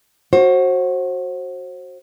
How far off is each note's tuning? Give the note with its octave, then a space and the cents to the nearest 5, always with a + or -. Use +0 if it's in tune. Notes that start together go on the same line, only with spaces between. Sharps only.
F#4 +0 C5 +30